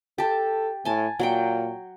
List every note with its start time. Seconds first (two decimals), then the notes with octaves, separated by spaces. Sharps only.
0.18 G4 A4 A5
0.85 A2 G#5 A5
1.19 A#2 F#3 F#5 G5